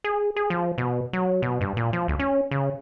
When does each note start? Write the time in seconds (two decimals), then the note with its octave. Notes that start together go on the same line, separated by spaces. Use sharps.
0.04 G#4
0.36 G#4
0.50 F3
0.78 B2
1.13 F#3
1.42 B2
1.61 G2
1.77 A#2
1.93 F3
2.08 D2
2.19 C#4
2.51 C#3